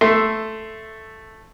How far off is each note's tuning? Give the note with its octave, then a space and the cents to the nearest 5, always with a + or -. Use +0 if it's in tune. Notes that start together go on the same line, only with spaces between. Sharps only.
A3 +0 E5 +0 C6 +0